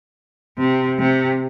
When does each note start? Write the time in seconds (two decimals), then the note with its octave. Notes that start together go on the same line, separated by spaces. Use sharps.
0.58 C3
0.99 C3